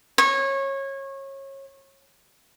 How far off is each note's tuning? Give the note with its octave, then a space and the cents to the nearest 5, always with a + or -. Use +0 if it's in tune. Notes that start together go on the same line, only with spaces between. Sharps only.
C#5 -25